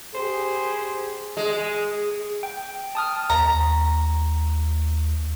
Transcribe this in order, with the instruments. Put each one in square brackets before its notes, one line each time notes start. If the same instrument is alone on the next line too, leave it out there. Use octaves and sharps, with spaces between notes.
[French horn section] G4 G#4 [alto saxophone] C5
[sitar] G#3
[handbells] G5
A5 D#6 F6
[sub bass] D#2 [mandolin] A#5